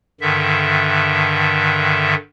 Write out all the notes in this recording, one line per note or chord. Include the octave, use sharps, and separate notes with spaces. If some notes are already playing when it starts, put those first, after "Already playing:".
G2 D3 D#3 E5